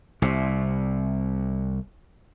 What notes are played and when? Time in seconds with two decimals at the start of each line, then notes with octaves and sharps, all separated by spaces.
0.22 C2 C3